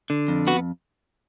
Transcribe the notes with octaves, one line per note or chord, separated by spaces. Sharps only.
D3
F2
B3 F#4